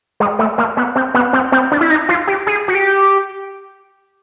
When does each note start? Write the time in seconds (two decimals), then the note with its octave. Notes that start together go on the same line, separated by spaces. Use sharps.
0.20 G#3
0.39 A3
0.58 A#3
0.77 B3
0.96 C4
1.14 B3
1.33 C4
1.52 C4
1.72 D4
1.81 E4
1.90 D#4
2.09 F4
2.27 G4
2.47 G#4
2.68 F#4
2.75 G4